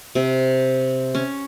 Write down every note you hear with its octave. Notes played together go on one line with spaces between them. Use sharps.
C3
C#4